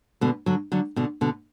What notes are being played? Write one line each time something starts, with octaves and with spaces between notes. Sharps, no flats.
B2 D3
D3 F#3
D3 F#3
B2 D3
B2 D3